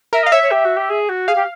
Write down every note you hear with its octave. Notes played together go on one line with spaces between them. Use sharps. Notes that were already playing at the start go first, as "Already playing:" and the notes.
A#4 E5
D#5 F5
C#5 E5
C#5
G4
F#4
G4
G#4
F#4
G#4 F5
G4